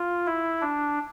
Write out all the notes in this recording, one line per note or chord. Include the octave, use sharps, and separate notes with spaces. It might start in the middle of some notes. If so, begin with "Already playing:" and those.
Already playing: F4
E4
D4